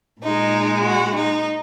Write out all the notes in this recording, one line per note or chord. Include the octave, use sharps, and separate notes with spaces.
A#2 D#4
G#3
F#4
D#4